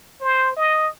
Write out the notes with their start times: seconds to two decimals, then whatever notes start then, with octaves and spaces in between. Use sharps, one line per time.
0.21 C5
0.57 D#5